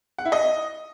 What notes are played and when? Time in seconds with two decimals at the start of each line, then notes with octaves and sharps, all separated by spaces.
0.18 F#5
0.25 E4
0.32 D#5